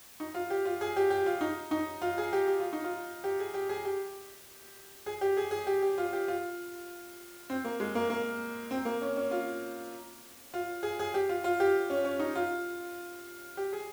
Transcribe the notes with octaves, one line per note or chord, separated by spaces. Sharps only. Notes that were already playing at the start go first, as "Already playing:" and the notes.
D#4
F4
G4
F4
G#4
G4
G4
F4
D#4
D#4
F4
G#4
G4
G4
F4
D#4
F4
G4
G#4
G4
G#4
G4
G#4
G4
G#4
G#4
G4
G4
F4
G4
F4
C4
A#3
G#3
A#3
A#3
C4
A#3
C#4
C#4
F4
F4
G#4
G#4
G4
F4
F4
G4
C#4
C#4
D#4
F4
G4
G#4